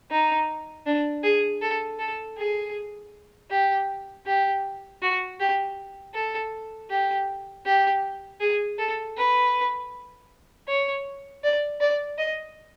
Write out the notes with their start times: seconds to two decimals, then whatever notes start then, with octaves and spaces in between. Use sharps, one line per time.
0.11 D#4
0.86 D4
1.24 G#4
1.61 A4
1.99 A4
2.38 G#4
3.50 G4
4.26 G4
5.02 F#4
5.40 G4
6.14 A4
6.90 G4
7.65 G4
8.40 G#4
8.79 A4
9.17 B4
10.67 C#5
11.44 D5
11.80 D5
12.18 D#5